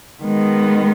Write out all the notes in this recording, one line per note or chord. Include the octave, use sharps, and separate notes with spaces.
D#3 G#3 B3